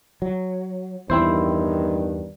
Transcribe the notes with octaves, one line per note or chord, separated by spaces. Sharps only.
F#3
E2 G2 D#3 C4 E4 C5